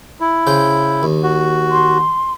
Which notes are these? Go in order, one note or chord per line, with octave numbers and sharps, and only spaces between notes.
E4
C#3 C5 G5
D#2
F#4
C6